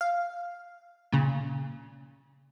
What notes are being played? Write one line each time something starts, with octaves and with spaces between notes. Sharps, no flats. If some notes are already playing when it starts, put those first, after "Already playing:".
F5
A#2 C#3